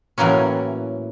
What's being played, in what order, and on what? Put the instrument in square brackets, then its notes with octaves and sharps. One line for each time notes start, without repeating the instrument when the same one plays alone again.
[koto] A2 E3 F#3 A#3 C#4